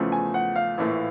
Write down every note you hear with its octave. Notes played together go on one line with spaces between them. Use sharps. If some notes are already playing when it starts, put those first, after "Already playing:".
Already playing: E2 C#3 F3 A3
G#5
F#5
F5
A#1 A2 E3 A3